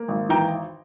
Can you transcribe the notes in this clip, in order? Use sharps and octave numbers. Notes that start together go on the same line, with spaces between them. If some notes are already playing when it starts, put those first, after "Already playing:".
Already playing: A#3
G#1
E3 G5 A#5